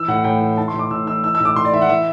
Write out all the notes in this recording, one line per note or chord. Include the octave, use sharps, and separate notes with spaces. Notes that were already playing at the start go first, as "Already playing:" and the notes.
Already playing: E3 E6
A2 F#5
A2 G5
E3
E3 A5
C6
A2
D6
A2 E6
E3 E6
E3 E6
E6
A2
D6
A2 C6
D5
E3 E5
F#5
E3 E5